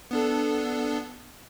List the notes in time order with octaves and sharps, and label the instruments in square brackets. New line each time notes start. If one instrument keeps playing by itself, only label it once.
[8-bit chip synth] B3 D4 A4